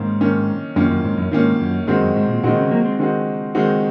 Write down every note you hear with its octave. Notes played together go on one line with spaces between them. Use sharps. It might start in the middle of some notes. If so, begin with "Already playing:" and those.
Already playing: G#2 D#3 A#3 C#4
D#3 A#3 C#4
F#2 D#3 A#3 C#4
F#2
G#2
F#2
G#2 D#3 A#3 C#4
F#2
G#2 D#3 G#3 C4 D#4 F#4
F#2
G#2
A#2
A#2 D#3 G#3 C4 D#4 F#4
C#3
F#3 A#3
G#3 C4
D#3 G#3 C4 D#4 F#4
D#3 G#3 C4 D#4 F#4